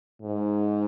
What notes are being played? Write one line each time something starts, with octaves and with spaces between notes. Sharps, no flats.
G#2